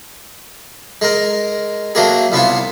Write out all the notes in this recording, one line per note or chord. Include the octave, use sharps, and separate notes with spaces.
G#3 A#4
F#3 A3 A#3 G#4
C2 B3 E4 F4